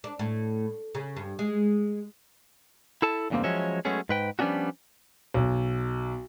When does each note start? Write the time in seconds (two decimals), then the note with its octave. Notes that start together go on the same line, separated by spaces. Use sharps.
0.04 D4
0.19 A2
0.95 C#3
1.16 G2
1.39 G#3
3.02 E4 A4 A5
3.30 E2 G2 C#3 A3 A#3 C4
3.44 F3 F#3 G#3 C#4 C#5 E5
3.85 F#3 G#3 A3 B3 C#4 G#4
4.09 G#2 B4 G5
4.39 F3 G3 B3 C#4 D4 F#4
5.34 B1